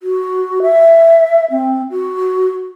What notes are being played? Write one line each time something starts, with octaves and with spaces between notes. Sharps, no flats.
F#4
E5
C4
F#4